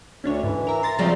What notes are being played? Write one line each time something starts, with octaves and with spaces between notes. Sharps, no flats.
D2 C#4 D4 C#5
G#2 E3
A#4 E5 A#5
C6 A6 A#6
C#3 F3 F#3 G#3 A3 C4 D5